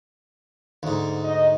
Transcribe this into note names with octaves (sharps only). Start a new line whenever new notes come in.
D2 G#2
D#4 D#5